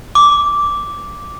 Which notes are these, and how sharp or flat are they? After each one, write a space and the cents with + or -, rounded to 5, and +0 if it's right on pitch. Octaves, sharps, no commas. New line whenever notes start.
D6 -10